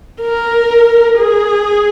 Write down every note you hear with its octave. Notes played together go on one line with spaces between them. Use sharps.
A#4
G#4